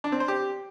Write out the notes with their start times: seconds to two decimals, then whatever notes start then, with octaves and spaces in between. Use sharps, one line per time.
0.04 D4
0.12 C4
0.20 C5
0.28 G4